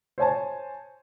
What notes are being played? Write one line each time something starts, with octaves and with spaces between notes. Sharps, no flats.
C5 C#5 G#5 A5